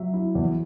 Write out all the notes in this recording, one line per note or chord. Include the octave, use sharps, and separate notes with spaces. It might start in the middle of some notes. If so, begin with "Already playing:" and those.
Already playing: F#3 E5
E4
E2